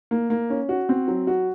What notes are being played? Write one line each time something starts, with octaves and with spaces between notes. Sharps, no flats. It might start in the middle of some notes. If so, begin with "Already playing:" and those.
A#3
A#3
C#4
F#4
C4
F#3
F#4